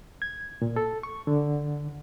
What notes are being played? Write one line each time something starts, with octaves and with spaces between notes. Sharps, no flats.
G#6
A#2
A4
C#6
D3